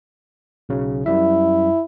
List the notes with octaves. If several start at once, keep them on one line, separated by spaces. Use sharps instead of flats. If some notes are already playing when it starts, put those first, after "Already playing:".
B1 C#3 F#3
F#2 G3 E4 E5